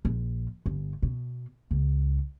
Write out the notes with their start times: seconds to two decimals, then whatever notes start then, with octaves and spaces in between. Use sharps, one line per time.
0.05 A#1
0.66 G1
1.03 B2
1.71 C#2